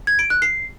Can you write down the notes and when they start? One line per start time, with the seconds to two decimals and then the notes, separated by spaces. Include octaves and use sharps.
0.07 G#6
0.19 D7
0.30 F#6
0.42 C7